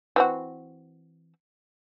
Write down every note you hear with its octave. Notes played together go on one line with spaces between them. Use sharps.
E3 C4 F#4